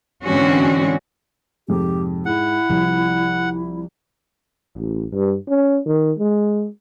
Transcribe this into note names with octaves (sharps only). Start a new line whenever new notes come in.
G#2 D3 E3 C4 C#4 F#4
F2 G#2 C3 G4
G#2 E4 F#5
C2 F3
A1
G2
C#4
D#3
G#3